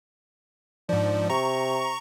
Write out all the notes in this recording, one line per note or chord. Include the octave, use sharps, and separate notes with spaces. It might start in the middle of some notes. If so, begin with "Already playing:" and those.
G#2 F3 D4
C3 A#5 C#6